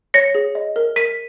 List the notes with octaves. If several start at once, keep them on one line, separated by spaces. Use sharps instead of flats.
C#5 A#6 C#7
G#4
D#5
A#4
A#4 B6 D#7